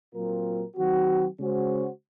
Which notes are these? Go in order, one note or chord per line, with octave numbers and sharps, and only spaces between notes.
A#2 F#3 C4 F4 A#4
D#3 F#3 C4 F#4
C#3 G#3 C#4 F#4 C5